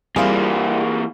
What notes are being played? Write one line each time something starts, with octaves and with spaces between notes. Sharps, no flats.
E3 G3 A#3 C4 E4 F4 G#4